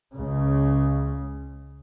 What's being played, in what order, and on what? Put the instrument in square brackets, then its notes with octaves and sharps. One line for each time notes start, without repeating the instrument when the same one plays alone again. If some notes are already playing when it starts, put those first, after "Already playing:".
[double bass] C#2 C#3